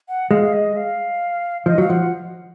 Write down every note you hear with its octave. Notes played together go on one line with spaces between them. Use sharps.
F#5
G#3 F5
F5
D#5
F5
F3 D#5
F#3 F5
F3 F#5